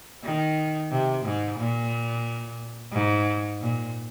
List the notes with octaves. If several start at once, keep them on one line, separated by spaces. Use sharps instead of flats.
D#3
C3
G#2
A#2
G#2
A#2